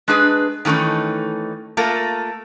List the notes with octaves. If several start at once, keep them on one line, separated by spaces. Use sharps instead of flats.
G#3 D4 G#4 B4
D#3 E3 A3 C#4 D#4
A3 A#3 F4 A4 A#4